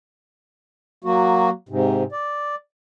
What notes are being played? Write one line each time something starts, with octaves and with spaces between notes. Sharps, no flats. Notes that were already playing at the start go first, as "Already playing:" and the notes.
F#3 A#3 F#4
G#2 C3
D5